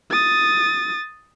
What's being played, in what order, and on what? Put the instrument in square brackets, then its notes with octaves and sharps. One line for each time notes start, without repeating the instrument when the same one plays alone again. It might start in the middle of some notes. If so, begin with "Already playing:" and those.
[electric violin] D#6 A6